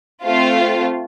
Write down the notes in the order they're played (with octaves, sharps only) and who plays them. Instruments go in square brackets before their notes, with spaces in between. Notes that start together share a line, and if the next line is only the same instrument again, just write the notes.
[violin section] A3 C4 F4